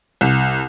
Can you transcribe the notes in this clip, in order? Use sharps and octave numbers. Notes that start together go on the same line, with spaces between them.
C2